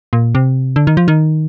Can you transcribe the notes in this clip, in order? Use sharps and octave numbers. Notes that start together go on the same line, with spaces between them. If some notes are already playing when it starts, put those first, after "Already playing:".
A#2
C3
D3
D#3
F3
D#3